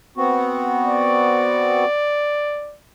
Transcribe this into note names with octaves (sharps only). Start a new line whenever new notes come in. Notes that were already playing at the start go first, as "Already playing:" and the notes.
B3 C4 F#4
D5